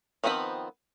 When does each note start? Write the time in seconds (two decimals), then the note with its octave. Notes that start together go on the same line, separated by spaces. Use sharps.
0.24 D#3 F3 B3 C4 B4